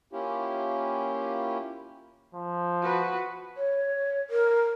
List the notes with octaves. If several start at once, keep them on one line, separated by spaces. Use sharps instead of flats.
A#3 C#4 E4 F4 G4
F3
F#4 B4
C#5
A#4